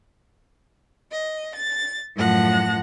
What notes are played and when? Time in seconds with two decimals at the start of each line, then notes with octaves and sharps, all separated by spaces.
1.10 D#5
1.55 A6
2.16 F#2 A2 F3 F#5 A5 A#6